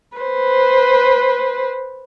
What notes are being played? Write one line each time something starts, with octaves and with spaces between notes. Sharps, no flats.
B4 C5